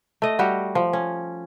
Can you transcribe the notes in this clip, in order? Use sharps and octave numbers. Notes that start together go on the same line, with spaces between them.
A3 D#5
G3 F#4 G4
F3
C#4